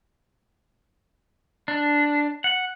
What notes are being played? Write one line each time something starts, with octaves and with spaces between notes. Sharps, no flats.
D4
F#5